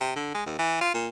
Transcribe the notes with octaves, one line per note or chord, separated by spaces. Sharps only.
C3
D3
G#3
D#2
E3
F4
A#2